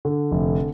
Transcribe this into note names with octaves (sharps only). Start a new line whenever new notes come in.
D3
F1